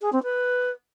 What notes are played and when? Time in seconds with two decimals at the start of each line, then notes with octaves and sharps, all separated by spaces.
0.01 G#4
0.12 C4
0.23 B4